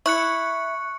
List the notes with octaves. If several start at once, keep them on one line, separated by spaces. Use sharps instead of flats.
E4 C#6 F#6 C#7